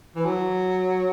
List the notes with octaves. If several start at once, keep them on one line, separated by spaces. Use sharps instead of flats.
E3
F#3